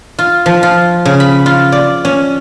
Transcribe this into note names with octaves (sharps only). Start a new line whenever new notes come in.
F4
F3
F4
C#3
B5
F4
D5
C#4